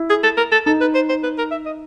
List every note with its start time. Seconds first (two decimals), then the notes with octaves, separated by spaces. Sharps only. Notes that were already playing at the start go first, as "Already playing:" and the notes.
Already playing: E4
0.10 G#4
0.23 A4
0.37 A#4
0.52 A4
0.66 D#4 A4
0.81 B4
0.95 C5
1.09 C5
1.23 B4
1.38 A#4
1.51 E5
1.66 D#5